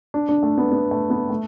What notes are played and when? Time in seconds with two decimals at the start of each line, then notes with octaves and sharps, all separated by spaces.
0.14 D4
0.29 D4
0.43 A3
0.58 B3
0.72 B3
0.91 A3
1.10 B3
1.30 A3